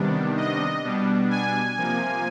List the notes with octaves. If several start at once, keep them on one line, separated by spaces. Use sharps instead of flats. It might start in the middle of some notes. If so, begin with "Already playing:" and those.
Already playing: C3 D#3 G3 B3 D4
D#5
B2 G3 B3 D4
G#5
C3 F3 A#3